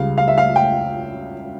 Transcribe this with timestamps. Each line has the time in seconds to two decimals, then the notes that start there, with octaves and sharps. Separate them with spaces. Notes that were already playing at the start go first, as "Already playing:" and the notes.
Already playing: C#2 C#3 G3 F5
0.18 F5
0.28 E5
0.38 F5
0.56 G5